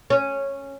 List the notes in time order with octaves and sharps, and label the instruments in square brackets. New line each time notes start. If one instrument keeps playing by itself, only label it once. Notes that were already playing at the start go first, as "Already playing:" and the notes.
[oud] C#4